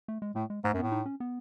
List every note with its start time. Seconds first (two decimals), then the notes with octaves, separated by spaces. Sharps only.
0.08 A3
0.22 G#3
0.35 A2 A3
0.50 G#3
0.64 G#2 A3
0.74 F#2
0.78 A2 B3
0.92 D#4
1.06 C#4
1.20 B3